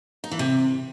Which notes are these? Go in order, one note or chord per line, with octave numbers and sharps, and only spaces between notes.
D#4
E3
C3